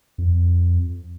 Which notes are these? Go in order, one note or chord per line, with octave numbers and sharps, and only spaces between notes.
F2